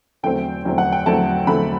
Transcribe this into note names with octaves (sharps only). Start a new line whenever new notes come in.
E2 D3 F#3 A3 C4 G5
E2 D3 F#3 A3 C4
F#5
G5
E2 D3 F#3 A3 C4 A5
E2 D3 F#3 A3 C4 B5